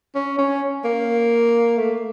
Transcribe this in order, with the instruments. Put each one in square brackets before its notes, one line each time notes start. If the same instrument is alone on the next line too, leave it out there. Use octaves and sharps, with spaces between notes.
[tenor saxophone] C#4
C#4
A#3
A3